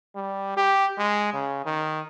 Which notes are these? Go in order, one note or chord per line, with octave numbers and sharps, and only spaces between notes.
G3
G4
G#3
C#3
D#3